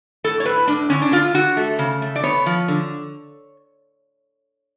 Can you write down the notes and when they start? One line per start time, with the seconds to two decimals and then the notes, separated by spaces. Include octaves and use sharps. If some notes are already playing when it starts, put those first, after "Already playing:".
0.24 A2 A4
0.40 C#5
0.45 A2 B4
0.68 A2 D4
0.90 D3 C#4
1.02 D4
1.12 D3 F4
1.35 D3 F#4
1.57 A3
1.79 C#3
2.02 A3
2.16 D5
2.23 B3 C#5
2.46 F3
2.68 D3